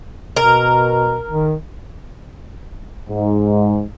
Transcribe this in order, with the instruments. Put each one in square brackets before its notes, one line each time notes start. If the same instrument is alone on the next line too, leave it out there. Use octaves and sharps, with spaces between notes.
[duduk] B2 [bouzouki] A#4
[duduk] D#3
[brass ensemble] G#2